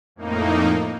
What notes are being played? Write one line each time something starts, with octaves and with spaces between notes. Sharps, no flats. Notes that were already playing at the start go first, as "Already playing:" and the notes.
F2 A2 A#3 D#4